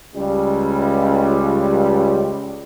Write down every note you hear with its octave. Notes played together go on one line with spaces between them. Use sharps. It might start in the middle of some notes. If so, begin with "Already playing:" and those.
C#2 G3